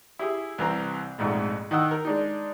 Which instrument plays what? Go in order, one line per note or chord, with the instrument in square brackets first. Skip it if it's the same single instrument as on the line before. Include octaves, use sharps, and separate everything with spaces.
[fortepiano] E4 G4 G#4
C2 E3 C4 A#5
A#1 F2 G#2 A3
D#3 D#5 F#5 E6
A#4
G#3 D4 D#4